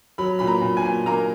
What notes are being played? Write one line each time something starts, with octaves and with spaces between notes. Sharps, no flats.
F#3 B5
A#2 B5
A#5
A#2
G#5
A#2
A#3 A#5